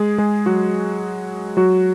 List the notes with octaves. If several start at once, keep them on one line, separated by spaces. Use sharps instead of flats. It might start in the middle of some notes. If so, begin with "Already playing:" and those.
Already playing: G#3 G#4
G#3 G#4
F#3 F#4
F#3 F#4